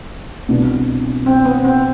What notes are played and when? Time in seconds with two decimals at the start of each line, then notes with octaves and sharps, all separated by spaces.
0.49 C2 B2 B3 D4
1.26 C4
1.45 B3
1.64 C4